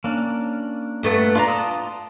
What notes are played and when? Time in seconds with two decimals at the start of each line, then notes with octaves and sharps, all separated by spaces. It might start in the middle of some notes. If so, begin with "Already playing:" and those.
0.04 A#3 C#4 D4
1.03 G2 A3 B3
1.35 D4 F4 D5 A#5
1.48 A5 C6 D#6